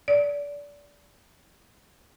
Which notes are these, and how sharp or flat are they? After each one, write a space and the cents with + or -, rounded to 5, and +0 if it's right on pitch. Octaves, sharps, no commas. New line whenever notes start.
D5 -25